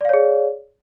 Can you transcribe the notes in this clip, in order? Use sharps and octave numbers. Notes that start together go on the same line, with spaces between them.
G#4 C#5 D5 F5